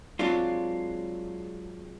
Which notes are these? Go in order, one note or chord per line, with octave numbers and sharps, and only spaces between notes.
F#3 G#3 C4 D4 F4